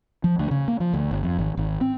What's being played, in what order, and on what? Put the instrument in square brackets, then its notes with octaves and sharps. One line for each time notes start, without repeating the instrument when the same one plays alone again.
[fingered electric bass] F3
D2
C#3
A#3
F3
D2
G1
F2
G#1
G#1
C4